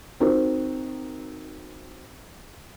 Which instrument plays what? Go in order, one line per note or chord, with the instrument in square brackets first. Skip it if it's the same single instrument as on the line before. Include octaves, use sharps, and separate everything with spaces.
[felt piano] C4 D#4 F#4 A#4